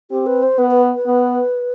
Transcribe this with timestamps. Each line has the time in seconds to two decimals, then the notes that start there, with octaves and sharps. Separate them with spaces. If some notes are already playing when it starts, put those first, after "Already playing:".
0.11 C4 G4
0.27 B4
0.43 C5
0.58 B3 B4
0.71 B4
0.95 B4
1.07 B3